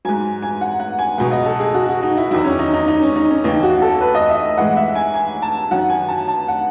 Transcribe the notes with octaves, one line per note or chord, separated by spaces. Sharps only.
G#2 F#3 G#5
G#5
F#5
F#5
G#5
C#2 B2 F#3 F#5
D#5
A4
G#4
F#4
F#4
D#4
E4
E2 D#3 F#3 E4
C#4
D#4
D#4
D#4
C#4
D#4
C#4
D#2 C#3 E3 D#4
F#4
A4
B4
D#5
E5
A2 E3 G#3 F#5
E5
G#5
G#5
A5
F#2 D#3 F#3 F#5
G#5
A5
A5
F#5